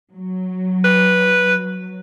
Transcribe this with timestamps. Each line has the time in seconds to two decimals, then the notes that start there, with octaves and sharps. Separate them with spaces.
0.14 F#3
0.85 B4